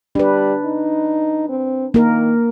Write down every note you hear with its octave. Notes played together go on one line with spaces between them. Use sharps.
G3 D4 B4
D#4
C4
D#3 A#3 A#4